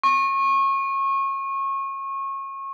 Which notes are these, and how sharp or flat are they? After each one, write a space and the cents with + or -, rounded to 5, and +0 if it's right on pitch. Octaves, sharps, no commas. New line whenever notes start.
C#6 -25